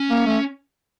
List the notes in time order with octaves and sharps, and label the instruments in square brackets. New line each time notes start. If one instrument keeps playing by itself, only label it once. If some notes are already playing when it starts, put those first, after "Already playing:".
Already playing: [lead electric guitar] C#4
[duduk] A#3
A3